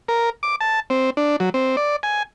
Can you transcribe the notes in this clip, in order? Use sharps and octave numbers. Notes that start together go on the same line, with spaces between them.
A#4
D6
A5
C4
D4
F#3
C4
D5
G#5